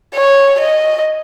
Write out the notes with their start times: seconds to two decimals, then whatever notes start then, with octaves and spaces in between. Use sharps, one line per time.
0.15 C#5
0.60 D#5